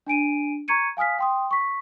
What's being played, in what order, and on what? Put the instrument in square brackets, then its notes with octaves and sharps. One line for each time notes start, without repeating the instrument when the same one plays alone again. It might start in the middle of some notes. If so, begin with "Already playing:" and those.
[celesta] D4 G#5 D7 D#7
A#5 C#6 G#6 C#7 D#7
F5 G#5 D#6 F6 B6
G5 C6 D#6
C#6 B6